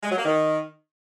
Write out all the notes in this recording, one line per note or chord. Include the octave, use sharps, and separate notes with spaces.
G#3
F#3
A#3
D#3